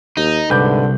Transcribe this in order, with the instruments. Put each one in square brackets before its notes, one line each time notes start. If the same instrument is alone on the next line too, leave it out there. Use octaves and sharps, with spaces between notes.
[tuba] D#2 [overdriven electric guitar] D#4
[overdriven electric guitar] C2 [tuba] G#2 [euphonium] D3 [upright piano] B4 D6 G6